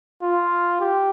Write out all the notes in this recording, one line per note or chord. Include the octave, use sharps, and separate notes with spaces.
F4
G4